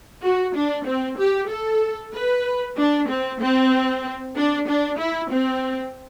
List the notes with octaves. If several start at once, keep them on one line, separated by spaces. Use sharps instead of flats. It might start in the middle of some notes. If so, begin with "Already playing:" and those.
F#4
D4
C4
G4
A4
B4
D4
C4
C4
D4
D4
E4
C4